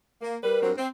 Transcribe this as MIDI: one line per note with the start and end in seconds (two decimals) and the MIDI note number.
0.22 0.36 58
0.43 0.61 55
0.43 0.72 70
0.43 0.61 71
0.62 0.72 43
0.62 0.72 54
0.62 0.72 60
0.78 0.88 60